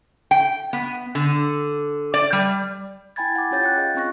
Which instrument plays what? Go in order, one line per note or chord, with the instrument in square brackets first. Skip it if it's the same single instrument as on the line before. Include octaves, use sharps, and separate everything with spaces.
[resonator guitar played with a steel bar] G5
B3
D3
D5
G3
[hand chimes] E4 G5 G#5 B5 G#6 A6
F#5 G#5 D6
C#4 F4 G4 C#5 G6 A6
G5 F#6
G#4 D#5 F5
C4 C#4 F4 C#6 F#6 A#6